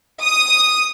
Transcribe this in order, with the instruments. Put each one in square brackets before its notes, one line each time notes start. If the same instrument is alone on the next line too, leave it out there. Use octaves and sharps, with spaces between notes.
[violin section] D#6